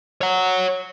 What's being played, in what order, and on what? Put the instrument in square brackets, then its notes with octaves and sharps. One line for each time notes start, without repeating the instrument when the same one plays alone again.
[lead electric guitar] C#5 F#5